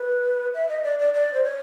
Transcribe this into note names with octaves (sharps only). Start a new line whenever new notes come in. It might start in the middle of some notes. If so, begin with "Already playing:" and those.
Already playing: B4
E5
D#5
D5
D5
D5
C5
C#5